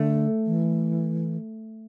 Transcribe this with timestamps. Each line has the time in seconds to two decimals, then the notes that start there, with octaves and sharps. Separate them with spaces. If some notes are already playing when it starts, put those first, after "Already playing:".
Already playing: D3 A3
0.47 E3